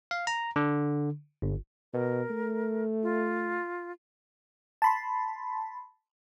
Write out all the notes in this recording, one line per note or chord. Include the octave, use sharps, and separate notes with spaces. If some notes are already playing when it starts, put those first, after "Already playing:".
F5
A#5
D3
G1
B2 A#4
A3
F4
A5 B5 C6